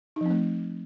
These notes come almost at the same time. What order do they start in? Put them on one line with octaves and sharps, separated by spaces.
D#4 F3 C4 A3